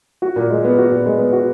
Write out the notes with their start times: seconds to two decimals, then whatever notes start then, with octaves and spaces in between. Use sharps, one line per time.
0.22 F#4
0.36 A#2
0.50 G#3
0.64 B3
0.78 F#4
0.91 A#2
1.06 G#3
1.19 B3
1.33 F#4